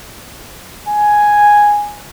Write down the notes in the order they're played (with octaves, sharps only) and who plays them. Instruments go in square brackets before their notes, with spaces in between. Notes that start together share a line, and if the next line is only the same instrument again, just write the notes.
[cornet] G#5